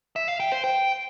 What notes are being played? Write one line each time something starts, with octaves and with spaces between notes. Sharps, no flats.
E5
F5
G5
C5
G5